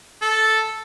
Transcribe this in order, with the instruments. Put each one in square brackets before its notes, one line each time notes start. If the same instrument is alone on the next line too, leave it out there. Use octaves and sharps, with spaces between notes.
[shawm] A4